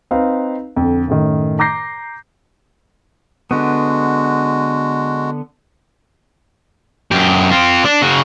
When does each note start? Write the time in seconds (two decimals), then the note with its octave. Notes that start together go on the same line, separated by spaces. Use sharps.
0.11 C4 D#4 B4 F5
0.76 F2 D3
1.08 F#2 A2 D#3
1.59 A#5 D6 G6 A#6 C7
3.51 D3 G#3 B3 F#4
7.12 F#2 G4
7.52 C4 F4
7.85 D4
8.02 C#3 F#4